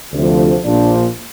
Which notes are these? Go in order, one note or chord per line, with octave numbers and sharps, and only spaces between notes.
D2 C3 F3
A#1 A#2 F3 D4